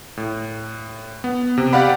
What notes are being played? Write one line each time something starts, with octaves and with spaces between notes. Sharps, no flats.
A2
B3
C3
G4 D5 F5 F#5 B5